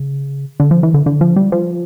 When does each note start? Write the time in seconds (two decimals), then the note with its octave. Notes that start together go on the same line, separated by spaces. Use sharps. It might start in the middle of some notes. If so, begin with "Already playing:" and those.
Already playing: C#3
0.60 D3
0.71 F3
0.83 E3
0.94 D3
1.06 D3
1.21 F3
1.36 G3
1.52 F3